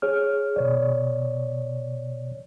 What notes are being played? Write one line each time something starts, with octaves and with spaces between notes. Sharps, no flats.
G#4 C#5 F6
B2 C#5 D5